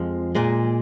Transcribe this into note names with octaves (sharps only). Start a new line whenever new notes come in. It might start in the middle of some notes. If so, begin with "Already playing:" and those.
Already playing: F2 F3 G#3
A#2 G#3